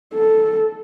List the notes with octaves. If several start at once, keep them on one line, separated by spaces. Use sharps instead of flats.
A4